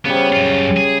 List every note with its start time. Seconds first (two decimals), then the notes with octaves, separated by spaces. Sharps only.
0.05 C#3 G3 B3
0.33 F#2 F4
0.77 G#4